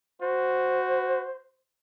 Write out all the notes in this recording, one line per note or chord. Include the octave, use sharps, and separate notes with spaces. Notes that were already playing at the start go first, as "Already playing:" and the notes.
F#4 C5